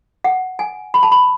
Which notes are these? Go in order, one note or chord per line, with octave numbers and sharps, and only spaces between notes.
F#5
G#5
B5
A5
B5